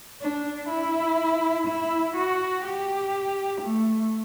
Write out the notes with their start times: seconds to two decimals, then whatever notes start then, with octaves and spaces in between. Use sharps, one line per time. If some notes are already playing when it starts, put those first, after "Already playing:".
0.21 D4
0.69 E4
1.67 E4
2.16 F#4
2.64 G4
3.61 A3